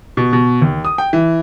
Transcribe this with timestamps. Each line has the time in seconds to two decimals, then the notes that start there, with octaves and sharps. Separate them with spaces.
0.17 B2
0.33 B2
0.62 D#2
0.85 D#6
0.98 G5
1.13 E3